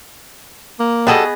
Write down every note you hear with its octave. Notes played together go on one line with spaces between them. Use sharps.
A#3
G3 B3 F#4 G#4 A4 D#5